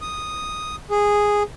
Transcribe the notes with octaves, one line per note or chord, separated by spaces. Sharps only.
D#6
G#4